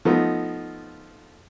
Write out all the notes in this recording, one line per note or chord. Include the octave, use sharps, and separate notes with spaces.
F3 A3 B3 D#4